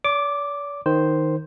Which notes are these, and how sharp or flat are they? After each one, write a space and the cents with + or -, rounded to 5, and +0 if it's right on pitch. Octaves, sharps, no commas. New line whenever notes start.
D5 -45 D6 +0
D#3 +0 C5 +0